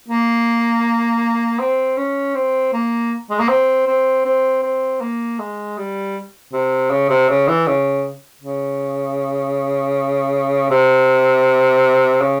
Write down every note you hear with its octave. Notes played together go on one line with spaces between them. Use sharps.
A#3
C4
C#4
C4
A#3
G#3
A#3
C4
C4
C4
C4
A#3
G#3
G3
C3
C#3
C3
C#3
E3
C#3
C#3
C3
C#3